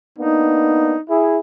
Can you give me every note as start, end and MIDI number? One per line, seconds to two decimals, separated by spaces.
0.18 0.95 58
0.18 0.95 59
0.18 0.95 62
0.18 1.00 63
1.09 1.38 64
1.09 1.38 68